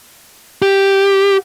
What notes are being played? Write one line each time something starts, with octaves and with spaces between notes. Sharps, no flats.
G4